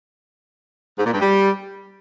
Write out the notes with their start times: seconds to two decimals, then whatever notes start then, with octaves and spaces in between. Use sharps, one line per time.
0.99 G#2
1.06 A#2
1.14 G2
1.21 G3